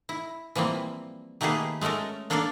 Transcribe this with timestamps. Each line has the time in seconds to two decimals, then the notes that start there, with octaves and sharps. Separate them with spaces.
0.09 E4
0.55 E3 F3 G3 A#3 C4
1.41 D#3 A3 A#3 G4 G#4 B4
1.81 G#3 A3 C#4 A4 A#4
2.30 A#3 D4 A4 A#4 D5 F5